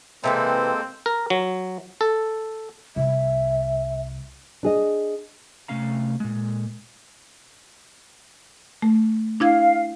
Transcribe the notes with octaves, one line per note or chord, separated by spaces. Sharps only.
C3 E3 G#3 A#3 C4 A4 B4
A#4
F#3
A4
C2 E5
D4 G#4 D#5
C3 A3 C#4 F5 A#5
A#2 G#3
A3
D4 E4 F5 G#6